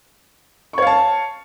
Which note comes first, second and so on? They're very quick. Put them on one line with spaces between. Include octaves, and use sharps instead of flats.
C#6 C#5 F5 A5